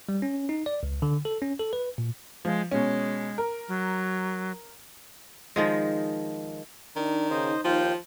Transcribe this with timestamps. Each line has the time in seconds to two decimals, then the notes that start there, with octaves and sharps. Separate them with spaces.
0.09 G3
0.22 C#4
0.49 D#4
0.66 D5
0.83 C#2
1.02 D3
1.25 A4
1.42 C#4
1.59 A4
1.73 B4
1.98 A#2
2.45 F3 G#3
2.71 B2 G#3 C#4
3.38 A#4
3.68 F#3
5.56 D#3 F3 G#3
6.96 D#3 D4 D#4
7.30 C#3 C5 D#5
7.65 D#2 F3 F4 G5